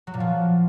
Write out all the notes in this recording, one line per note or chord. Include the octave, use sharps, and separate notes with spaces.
F#3
A#2
F3